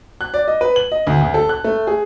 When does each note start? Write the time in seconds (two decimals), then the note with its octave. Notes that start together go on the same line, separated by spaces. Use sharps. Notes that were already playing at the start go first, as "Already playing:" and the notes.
0.21 F#6
0.34 D5
0.48 D#5
0.61 B4
0.76 F#7
0.92 D#5
1.07 D2
1.21 D2
1.34 A4
1.49 F#6
1.64 A3
1.87 G#4